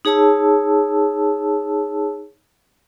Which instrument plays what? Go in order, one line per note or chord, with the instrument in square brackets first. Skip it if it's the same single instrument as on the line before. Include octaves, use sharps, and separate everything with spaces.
[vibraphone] D#4 G#4 C#5 A5 E6